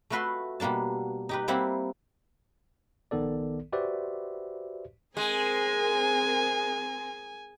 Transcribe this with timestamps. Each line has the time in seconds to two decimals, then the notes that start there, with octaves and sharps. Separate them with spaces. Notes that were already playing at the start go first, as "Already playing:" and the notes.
0.10 A3 F4 F#4 B4 E5 C6
0.60 B2 G3 A#3 D4 A5
1.29 D#4 G4 B4
1.48 G3 A#3 C4 E4 C5 F#5
3.11 A#1 D#3 B3 A4 D5
3.72 F#4 G4 B4 C5 D5 E5
5.17 G#3 C4 G#4 A#4 G#5